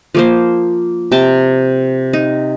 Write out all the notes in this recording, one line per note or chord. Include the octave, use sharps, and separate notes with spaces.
F3 A#3 C5
C3 G5 A5
D#4